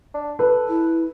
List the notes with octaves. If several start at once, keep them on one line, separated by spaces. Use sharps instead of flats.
D4
A4 B4
E4